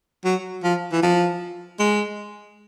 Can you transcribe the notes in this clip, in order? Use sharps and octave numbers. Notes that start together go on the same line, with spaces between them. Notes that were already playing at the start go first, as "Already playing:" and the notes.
F#3
F3
E3
F3
G#3